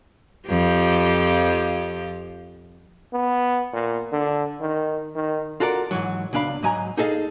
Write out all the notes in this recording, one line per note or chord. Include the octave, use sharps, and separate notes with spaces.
F2 F3 G4
B3
A#2
D3
D#3
D#3
F4 F#4 A4 A#4 D5
G#2 E3 F#3
C#2 B2 D4 F5 B5
G#2 F#3 D#5 G#5 A#5
D#4 G#4 A4 D#5 F5